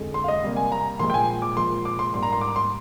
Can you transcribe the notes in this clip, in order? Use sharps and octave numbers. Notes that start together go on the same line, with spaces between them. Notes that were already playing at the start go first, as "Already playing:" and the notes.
Already playing: F2 D3 G#3
C6
F5
D#5
C3 G3 A#3
G#5
A#5
A#2 F3 G#3 C6
G5
G#5
D6
A#2 F3 G#3 C6
D6
C6
G#2 G3 A#3 C6
A#5
C6
D6
C6